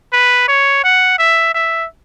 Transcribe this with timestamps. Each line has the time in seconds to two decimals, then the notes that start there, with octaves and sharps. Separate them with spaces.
0.13 B4
0.48 C#5
0.84 F#5
1.19 E5
1.54 E5